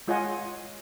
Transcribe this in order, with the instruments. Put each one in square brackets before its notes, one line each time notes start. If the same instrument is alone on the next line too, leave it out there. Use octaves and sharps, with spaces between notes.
[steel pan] G#3 F4 C#5 D#5 F#5 G#5